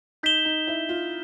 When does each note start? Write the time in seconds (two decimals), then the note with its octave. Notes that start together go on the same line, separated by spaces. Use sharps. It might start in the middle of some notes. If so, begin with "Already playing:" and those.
0.23 D#4 G6 B6 E7 G7
0.45 D#4
0.67 E4
0.89 F4